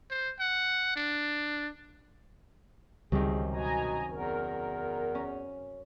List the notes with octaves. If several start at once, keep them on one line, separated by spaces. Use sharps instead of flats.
C5
F#5
D4
C#2 F#2 C3 D#3 G3 G#4
B2 D#5 G#5 A#5
E2 A#4
C#4